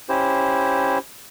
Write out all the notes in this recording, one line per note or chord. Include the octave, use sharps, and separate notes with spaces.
C#4 E4 G4 C5